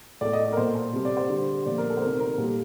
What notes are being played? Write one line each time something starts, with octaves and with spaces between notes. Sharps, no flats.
A2 A3 D5
D#5
D#5
A#4
A#2 A3 C5
A4
C3 G3
D5
C5
D3 G3
A#2 F3 A3 D5
A#4
A4
C5
C3 D#3 A3 A#4
A#4
A#2 G3 A4